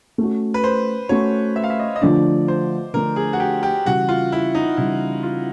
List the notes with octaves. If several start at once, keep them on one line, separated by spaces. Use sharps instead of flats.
A3 C#4 F#4
B4
C5
A3 C#4 F#4 C#5
E5
F5
E5
D#5
D#5
D3 F3 A3 D4 D5
C5
D3 F3 A3 D4 A#4
G#4
F#4
G4
G4
C#3 E3 G3 F#4
F4
E4
D#4
C#3 E3 G3 E4
F4